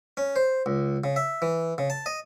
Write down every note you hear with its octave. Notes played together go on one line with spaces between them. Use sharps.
C#4
C5
C#2
C#3
E5
E3
C#3
A5
D#5